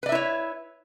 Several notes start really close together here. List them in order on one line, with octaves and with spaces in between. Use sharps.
B4 D5 E5 E4 C#5